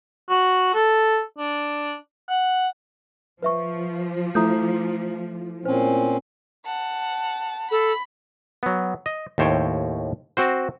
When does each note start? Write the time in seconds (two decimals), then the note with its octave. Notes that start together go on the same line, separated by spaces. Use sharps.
0.30 F#4
0.74 A4
1.38 D4
2.29 F#5
3.43 F3 B4 E5 C#6
4.35 A3 E4 A#5 D#6 G6
5.65 A#2 C4 C#4 C5 G#5
6.65 F#5 A5
7.71 A4 B5
8.63 F#3 B3
9.06 D#5
9.38 D#2 A2 C5 C#5 G5
10.37 C4 F#4 C5